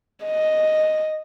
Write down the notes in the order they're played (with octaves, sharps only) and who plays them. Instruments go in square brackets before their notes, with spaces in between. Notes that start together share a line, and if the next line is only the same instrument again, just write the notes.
[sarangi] D#5